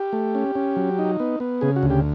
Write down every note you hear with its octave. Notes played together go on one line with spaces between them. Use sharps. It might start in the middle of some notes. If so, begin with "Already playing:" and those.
Already playing: G4
A3
C#4
C#4
F#3
D#4
B3
B3
C#3 G#4
F#4
D2
G4